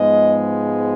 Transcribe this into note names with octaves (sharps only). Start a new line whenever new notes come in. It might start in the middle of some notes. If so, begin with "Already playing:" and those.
Already playing: G#2 F3 G#3 B3 D#5